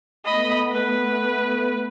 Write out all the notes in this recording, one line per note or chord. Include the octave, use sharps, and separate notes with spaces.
A3 B3 D#5 B5
B4